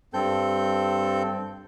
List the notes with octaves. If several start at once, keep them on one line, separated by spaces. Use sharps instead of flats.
G2 C4 A4 G6